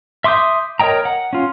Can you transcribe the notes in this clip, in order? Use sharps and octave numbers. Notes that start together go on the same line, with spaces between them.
E5 C6 D6 D#6 G6
A#4 C#5 D#5 G5 A#5
F#5
C#4 F4